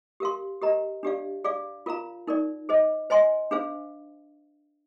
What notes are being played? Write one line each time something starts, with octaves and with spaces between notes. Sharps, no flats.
G4 A#4 F5 C6
G4 A#4 D#5 A#5
D4 G4 D5 F5
G#4 D5 F5
F4 A#4 F5 A#5
D#4 A#4 D5
G#4 C5 D#5
C5 D#5 G#5 C6
D4 G#4 C5 F5